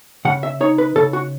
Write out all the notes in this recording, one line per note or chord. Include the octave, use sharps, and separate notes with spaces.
C#3 F#5
E5
D#4 C#5
B4
C#3 A4
F#4